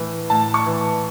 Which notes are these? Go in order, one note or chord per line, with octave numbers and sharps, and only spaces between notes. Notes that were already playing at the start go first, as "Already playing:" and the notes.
Already playing: A2 E3
A2 A5
C#6
E3